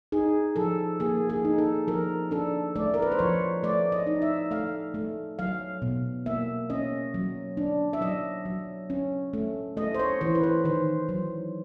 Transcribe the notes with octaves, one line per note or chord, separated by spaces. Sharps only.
D#4 G#4
F3 A4
A#3 G#4
G#4
D#4
A4
F3 A#4
D4 A4
A3 D5
A#4
B4
C5
F3 C#5
A3 D5
D#5
D#4
E5
A3 F5
A3
F#3 F5
B2
A#3 E5
C#4 D#5
F#3
D4
E5
F#3 D#5
F#3
C#4
A3
A3 D#5
C5
C#5
E3 C5
B4
C5
D#3 C5
F#3